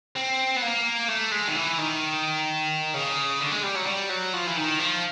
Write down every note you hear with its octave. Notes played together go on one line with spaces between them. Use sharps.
C4
B3
A#3
A3
G#3
D#3
E3
D#3
C#3
D3
G#3
G3
F#3
G3
F#3
F3
E3
D#3
F3